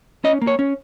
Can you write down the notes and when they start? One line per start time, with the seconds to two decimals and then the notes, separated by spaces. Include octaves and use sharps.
0.24 C#4 D#5
0.42 A#3
0.47 C#5
0.59 C#4